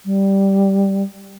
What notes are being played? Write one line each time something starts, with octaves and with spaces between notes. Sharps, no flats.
G3